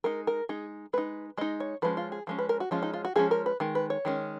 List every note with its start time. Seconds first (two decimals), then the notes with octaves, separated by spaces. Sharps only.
0.04 G#3 D#4 A#4
0.27 A#4
0.49 G#3 D#4 G#4
0.93 G#3 D#4 B4
1.38 G#3 D#4 D#5
1.60 C#5
1.82 F3 G#3 C#4 B4
1.97 F4
2.12 G#4
2.27 F3 G#3 C#4
2.39 B4
2.49 A#4
2.60 F#4
2.71 F3 G#3 C#4 F4
2.83 D#4
2.93 F4
3.05 F#4
3.16 F3 G#3 C#4 G#4
3.31 A#4
3.46 B4
3.60 D#3 G#3
3.75 B4
3.90 C#5
4.05 D#3 G#3 C#4